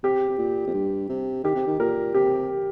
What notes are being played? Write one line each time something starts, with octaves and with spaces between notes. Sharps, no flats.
C3 G4
C3
A#2
F2
G2
C3
D#3 G4
C3
D#3
A#2 A#4
C3 G4